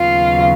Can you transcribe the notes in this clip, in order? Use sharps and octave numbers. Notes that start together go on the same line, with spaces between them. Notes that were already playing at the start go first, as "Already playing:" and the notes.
Already playing: D#2 C#3 F#3 B3 F4 F5